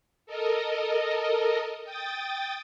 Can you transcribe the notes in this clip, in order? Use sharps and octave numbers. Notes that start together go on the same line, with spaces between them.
A4 A#4 D#5
G5 D#6 A6